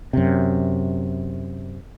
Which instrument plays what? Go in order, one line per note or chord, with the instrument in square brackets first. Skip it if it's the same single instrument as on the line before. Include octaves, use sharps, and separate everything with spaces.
[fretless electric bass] F#2 C3